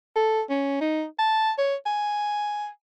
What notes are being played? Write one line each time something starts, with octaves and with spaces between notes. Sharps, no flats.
A4
C#4
D#4
A5
C#5
G#5